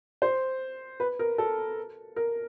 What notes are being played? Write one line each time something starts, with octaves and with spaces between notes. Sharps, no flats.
C5
B4
A#4
A4
A#4